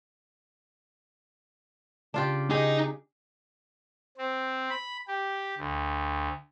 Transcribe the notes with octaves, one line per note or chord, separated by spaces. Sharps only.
C#3 D4 F4 G4
D#4 G4 G#4 D#5
C4
B5
G4
D2